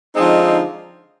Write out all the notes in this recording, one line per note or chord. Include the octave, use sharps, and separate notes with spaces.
D3 F3 G#3 C4 D#4